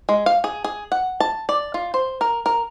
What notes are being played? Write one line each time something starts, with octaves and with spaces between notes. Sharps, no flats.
G#3
F5
G#4
G#4
F#5
A5
D5
F4
C5
A#4
A#4